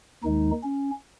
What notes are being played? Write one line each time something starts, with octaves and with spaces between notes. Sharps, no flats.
D#2 D#3 G#3 D#4
C#4